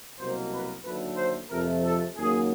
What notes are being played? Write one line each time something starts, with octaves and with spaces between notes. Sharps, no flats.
C2 B2 F#3 A#3 C5
B4
D#2 D3 F#3 A3 B4
C5
F2 C3 F3 A3 A#4
A4
D#2 C#3 F#3 A#3 G#4